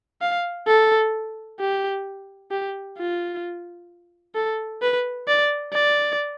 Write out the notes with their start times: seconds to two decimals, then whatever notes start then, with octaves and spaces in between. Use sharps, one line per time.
0.22 F5
0.67 A4
1.60 G4
2.51 G4
2.98 F4
4.35 A4
4.82 B4
5.28 D5
5.73 D5